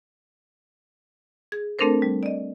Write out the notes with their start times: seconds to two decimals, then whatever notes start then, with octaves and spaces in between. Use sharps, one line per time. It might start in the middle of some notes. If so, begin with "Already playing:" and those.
1.52 G#4 G#6
1.79 A3 C4 D4 A4 A#4 C5
2.02 G3
2.23 D5 D#5